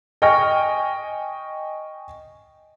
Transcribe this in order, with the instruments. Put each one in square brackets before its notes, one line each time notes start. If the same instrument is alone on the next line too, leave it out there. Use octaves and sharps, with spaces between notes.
[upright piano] D#5 G5 G#5 C#6 F6 A#6